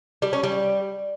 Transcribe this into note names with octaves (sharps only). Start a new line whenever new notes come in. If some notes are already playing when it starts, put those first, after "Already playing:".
G3
C#4
G3